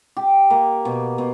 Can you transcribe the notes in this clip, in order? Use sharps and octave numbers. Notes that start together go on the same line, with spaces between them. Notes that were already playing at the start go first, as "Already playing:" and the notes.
G4
A#3
B2
B2